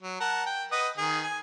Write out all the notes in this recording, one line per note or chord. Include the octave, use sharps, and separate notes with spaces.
F#3
A#4 F#5 A5
G5
B4 D#5 F#5
D#3 G#4
G#5